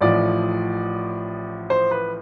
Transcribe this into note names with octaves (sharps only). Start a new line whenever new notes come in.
A1 A2 F3 D5
C5
B4